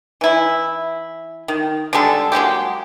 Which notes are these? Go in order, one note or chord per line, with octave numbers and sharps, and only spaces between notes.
E3 E4
D#3
D3 G3 G#3 A4
F#3 G#3 A#3 G4